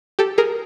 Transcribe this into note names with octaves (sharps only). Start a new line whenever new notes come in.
G4 A4
G#4 A#4